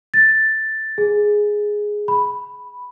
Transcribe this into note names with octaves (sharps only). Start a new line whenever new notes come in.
A6
G#4
B5